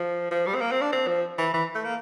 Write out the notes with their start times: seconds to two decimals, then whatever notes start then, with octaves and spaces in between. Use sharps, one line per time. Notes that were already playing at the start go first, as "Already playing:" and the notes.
Already playing: F3
0.31 F3
0.47 G3
0.55 C4
0.61 A#3
0.72 C4
0.82 D4
0.93 C4
1.07 F3
1.38 E3
1.54 E3
1.75 A3
1.85 A#3